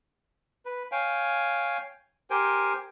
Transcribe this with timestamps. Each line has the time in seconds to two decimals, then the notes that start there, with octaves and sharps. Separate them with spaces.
0.66 B4
0.92 C#5 F5 G5 G#5
2.30 G4 A#4 C5 G5 G#5